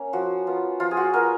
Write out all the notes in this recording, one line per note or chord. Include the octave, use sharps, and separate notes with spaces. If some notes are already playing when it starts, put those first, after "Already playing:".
Already playing: A#3 C#4
F3 F#4
B3 F4
F3 F4
G#4
F#4
B3 F4 A#4